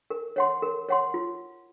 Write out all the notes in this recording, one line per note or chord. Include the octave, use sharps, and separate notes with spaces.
A#4
C#5 F#5 C6
A#4
C#5 F#5 C6
F4